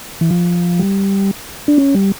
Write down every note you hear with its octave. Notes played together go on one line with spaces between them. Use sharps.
E3
F3
G3
D4
C#4
G3